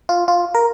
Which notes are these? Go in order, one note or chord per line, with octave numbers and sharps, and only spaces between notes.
F4
F4
A#4